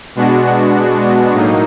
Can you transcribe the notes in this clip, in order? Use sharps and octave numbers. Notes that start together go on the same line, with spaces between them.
B2 G#3 B3 D4 F#4
A2 F#3 A#3 D#4